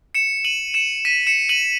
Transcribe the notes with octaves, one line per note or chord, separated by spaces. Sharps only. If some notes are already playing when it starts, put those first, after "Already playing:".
C#7 E7
D#7 F#7
C#7 E7
B6 D#7
C#7 E7
D#7 F#7